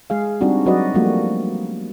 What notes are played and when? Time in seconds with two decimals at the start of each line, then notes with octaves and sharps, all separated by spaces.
0.10 G#3 G#4 F5
0.41 G3 C4 D4 D#4 F#4
0.66 F#3 F#4 B4 D5 D#5
0.94 F3 G3 A3 A#3 F#4